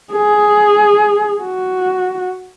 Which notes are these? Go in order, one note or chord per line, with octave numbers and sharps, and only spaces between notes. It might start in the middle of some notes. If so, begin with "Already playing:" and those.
G#4
F#4